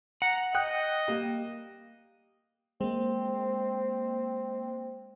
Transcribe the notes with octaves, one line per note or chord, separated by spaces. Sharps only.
F#5 A#5
D#5 G5 D#6 F#6
G3 A#3
G#3 A#3 C4